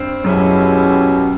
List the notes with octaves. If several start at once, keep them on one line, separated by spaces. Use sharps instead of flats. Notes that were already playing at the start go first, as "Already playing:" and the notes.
Already playing: G2 C4
F#2 B2 G#3 C#4 E4 G4